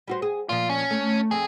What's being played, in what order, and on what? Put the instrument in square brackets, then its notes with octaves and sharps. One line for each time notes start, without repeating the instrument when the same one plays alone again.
[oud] G3 F#4 C5
G#4
[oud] A#2 F3 [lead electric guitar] F4
[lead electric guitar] C#4
[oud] A3
[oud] F2 C4 [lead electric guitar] G#4